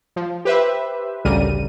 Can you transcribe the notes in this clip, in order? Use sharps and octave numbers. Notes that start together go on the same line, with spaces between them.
F3
G4 B4 C5 E5
A1 D2 C#3 G3 A#4 D#7